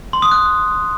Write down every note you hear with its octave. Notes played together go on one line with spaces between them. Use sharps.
C6
D#6
F#6